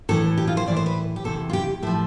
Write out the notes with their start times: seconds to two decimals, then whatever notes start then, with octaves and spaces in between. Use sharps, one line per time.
0.09 A2 E3 A4
0.37 G4
0.47 F4
0.57 C5
0.66 A2 E3 D5
0.77 C5
0.86 B4
1.16 G4
1.24 E2 C3 E3 A4
1.50 F4
1.53 G4
1.82 A2 E4
1.87 F3